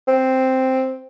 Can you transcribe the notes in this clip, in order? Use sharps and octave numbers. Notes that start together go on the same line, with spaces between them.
C4